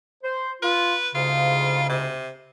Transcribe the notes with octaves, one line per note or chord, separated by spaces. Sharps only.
C5
F4 B4
D2 G#2 C#3 F4
C3